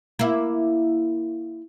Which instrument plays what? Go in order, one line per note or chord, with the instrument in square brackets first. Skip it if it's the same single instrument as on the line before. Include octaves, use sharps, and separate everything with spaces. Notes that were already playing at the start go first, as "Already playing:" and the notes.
[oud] A#3 E4